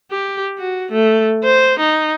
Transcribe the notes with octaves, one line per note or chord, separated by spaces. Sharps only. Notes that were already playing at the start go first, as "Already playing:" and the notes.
G4
F#4
A3
C5
D#4